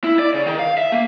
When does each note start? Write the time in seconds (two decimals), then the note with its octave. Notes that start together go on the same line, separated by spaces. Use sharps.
0.04 E4
0.19 D5
0.34 C#3
0.47 D#3
0.59 F5
0.78 E5
0.92 A#3